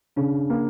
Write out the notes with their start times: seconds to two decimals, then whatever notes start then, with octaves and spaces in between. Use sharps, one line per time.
0.16 C#3 D4
0.50 A#3